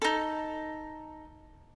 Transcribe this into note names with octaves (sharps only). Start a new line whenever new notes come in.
D#4 A4